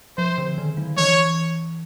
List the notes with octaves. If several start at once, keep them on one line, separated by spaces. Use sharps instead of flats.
F3 C5
D3
D#3
F#3
E3 C#5